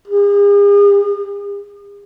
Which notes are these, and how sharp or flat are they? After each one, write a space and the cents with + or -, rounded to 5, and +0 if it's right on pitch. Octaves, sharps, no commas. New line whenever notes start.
G#4 -45